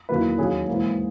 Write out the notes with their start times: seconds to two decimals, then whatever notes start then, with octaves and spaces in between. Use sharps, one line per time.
0.09 E2 D#3 F#3 A#3 B4
0.38 D#2 D#3 F#3 C#4 G#4
0.68 G#2 E3 A#3